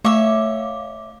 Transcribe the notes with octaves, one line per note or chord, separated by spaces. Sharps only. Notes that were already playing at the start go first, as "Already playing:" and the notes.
A3 C#5 E5 F5 D6